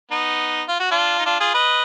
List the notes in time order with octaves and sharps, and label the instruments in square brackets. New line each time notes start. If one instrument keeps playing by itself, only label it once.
[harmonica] B3 D#4
F4
F#4
D4 F4
D#4
D4 F4
F4 G#4
B4 D#5